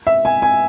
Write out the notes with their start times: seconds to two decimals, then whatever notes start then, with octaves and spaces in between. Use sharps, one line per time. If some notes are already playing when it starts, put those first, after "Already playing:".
0.07 E5
0.25 G#5
0.42 G#5